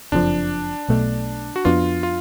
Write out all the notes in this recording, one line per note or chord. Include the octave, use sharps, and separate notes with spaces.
F#1 F2 F3 D4
B1 B2 A3
F#4
F2 F3 B3 D4 F4
F4